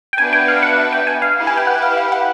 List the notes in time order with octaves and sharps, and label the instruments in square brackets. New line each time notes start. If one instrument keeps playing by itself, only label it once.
[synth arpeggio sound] G5
[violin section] B3 D4 F#4 B4 E5 [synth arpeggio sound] G#5
[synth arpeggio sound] G5
F5
F#5
G5
G#5
F5
[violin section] E4 G4 B4
[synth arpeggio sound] G#5
G5
F#5
F5
F5
F#5